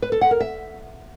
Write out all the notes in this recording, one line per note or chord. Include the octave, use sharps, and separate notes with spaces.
B4
A4
F#5
A#4
E5